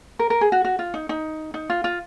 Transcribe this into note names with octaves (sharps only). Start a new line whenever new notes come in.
A#4
A#4
G#4
F#4
F#4
F4
D#4
D#4
D#4
F4
F4